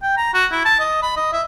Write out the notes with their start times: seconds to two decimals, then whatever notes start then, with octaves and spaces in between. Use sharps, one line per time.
0.02 G5
0.17 A#5
0.34 F#4
0.51 E4
0.65 A5
0.80 D#5
1.02 B5
1.16 D#5
1.32 E5